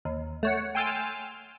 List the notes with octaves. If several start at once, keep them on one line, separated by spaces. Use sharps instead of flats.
D#2
A3 C#5 F#5
G5 G#5 C6 E6 F6 A6